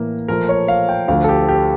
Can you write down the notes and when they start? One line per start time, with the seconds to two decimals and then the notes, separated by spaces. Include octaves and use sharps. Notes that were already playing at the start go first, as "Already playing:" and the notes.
Already playing: A2 E3 A#3
0.28 A#2 F3 A3 A#4
0.49 C#5
0.68 F5
0.89 G5
1.08 D2 D3 F3 A3 F5
1.24 A4
1.29 G4
1.49 G4